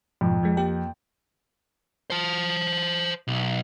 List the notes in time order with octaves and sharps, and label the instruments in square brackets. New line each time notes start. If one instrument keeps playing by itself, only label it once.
[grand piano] F2 [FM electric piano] G#2 B2
[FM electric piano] F3 G#3
A#3 G4 G5
[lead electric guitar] C5 A5
B1